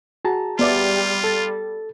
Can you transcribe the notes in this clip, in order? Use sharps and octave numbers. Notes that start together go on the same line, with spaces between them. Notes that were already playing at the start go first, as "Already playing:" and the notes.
F#4 G#4 A5 A#5
G3 B3 F4 D5 E5
A4 A6